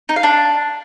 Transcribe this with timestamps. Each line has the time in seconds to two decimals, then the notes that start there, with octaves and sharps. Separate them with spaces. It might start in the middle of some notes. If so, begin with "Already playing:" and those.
0.09 D#4
0.16 F5
0.23 D4